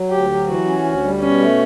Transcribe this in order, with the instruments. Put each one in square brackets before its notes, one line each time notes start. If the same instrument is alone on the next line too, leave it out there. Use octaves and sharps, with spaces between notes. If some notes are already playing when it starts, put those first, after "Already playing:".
Already playing: [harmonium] F#3
[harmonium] D2 [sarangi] G4
[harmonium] F#3
[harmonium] E3 [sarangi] F#4
[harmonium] C#4
D2
G3
[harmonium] B2 [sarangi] C#4
[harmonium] A3